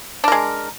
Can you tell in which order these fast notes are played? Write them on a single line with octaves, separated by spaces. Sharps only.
D4 A#4 G#3